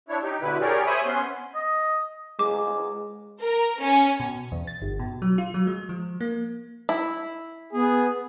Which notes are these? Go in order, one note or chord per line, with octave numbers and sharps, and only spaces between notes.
D4 E4 C#5
D#4 G4
B2 D3 E4 B4
G4 G#4 A#4 C#5 D5
C5 C#5 E5 G#5 B5 D#6
B3 C#4 C6
D#5
G#3 D6
A#4
C#4
B2
E2
A6
G1
B2
F#3
F4
F#3
G#3
F3
A#3
E4
B3 G#4